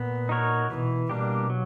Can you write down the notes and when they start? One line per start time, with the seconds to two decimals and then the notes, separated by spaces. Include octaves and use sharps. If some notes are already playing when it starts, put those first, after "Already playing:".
Already playing: A#2 B3
0.29 D#4 F#4 A#4 C#5
0.70 B2 E3
1.10 B2 G3 A#3 D4 G4
1.50 F#3